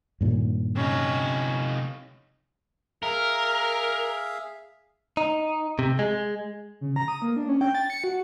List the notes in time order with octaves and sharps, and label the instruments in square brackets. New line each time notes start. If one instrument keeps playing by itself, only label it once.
[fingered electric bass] G2 A#2 D#3
[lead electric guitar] C3 D#4 [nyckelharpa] C#4
[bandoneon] G#4 E5 F5 [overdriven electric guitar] A#4
[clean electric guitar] D#4
C3
G#3
[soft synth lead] C#3
A#5
D#6
A#3
D4
C#4
G5
A6
C#7
F#4